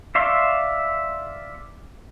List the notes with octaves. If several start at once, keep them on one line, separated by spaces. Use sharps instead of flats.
D5 E5 F5 C6 C#6